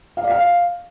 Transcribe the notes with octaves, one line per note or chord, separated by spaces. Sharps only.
F5
D5
F5